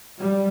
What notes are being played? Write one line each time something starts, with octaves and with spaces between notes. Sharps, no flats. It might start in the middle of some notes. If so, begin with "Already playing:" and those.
G3